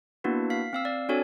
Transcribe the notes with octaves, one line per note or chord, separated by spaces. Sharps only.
A#3 B3 D4 E4 F#4 B4
F5 B6
C4 F5 E6
D5
C4 D4 F#4 A4 C#5 G#5